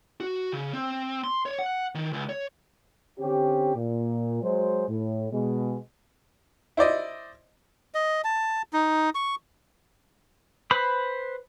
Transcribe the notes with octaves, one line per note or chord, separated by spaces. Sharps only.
F#4
C#3
C4
C6
C#5
F#5
D#3
C#2
C#5
D3 C4 C#4 G4
A#2
F#3 G#3 C5
A2
B2 G#3
E4 C5 D5 D#5
D#5
A5
D#4
C#6
B4 C5 B5